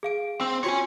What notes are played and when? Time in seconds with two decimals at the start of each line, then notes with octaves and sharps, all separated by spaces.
0.03 G#4 F5 D7
0.41 C4 E6
0.64 F4 F#4 C#5 G#5 C6